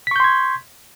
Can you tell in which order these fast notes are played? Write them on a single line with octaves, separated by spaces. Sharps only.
B6 C#6 G6 C6 G#6